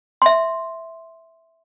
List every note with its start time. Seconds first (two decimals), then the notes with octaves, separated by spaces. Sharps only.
0.22 E5 C6